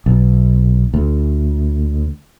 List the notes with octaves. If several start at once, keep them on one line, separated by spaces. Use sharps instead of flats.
B1
D2